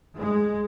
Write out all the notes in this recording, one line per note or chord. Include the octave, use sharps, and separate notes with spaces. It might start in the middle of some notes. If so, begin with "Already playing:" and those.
G#3